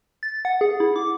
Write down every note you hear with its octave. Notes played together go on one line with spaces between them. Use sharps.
A6
F#5
G#4
E4
D6